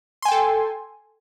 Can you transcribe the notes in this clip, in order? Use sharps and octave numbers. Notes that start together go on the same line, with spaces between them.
A4 G5 G#5 C6